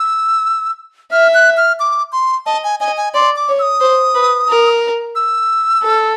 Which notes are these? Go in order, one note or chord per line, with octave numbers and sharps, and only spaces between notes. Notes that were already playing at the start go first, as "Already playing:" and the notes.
Already playing: E6
E5 F6
F#6
F6
D6
C6
D#5 A5
G#5
D#5 G#5
G#5
D5 C6
D6
C#5
E6
D#6
C5
B4
A#4
E6
A4